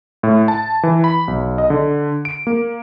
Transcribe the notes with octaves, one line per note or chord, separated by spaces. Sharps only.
A2
A5
E3
B5
B1
D#5
D3
D7
A#3